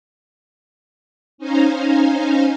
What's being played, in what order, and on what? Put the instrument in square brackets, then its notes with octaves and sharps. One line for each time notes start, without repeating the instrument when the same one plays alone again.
[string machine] C#4 D#4 C5 F5 G#5 A#5